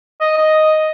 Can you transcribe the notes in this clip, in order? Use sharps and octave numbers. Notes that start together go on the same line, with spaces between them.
D#5
D#5